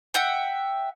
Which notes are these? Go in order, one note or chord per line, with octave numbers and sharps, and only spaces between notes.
E5 F#5 G5